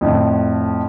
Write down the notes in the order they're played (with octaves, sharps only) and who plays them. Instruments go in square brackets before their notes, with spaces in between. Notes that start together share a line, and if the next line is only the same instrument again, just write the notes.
[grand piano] F2 A2 D3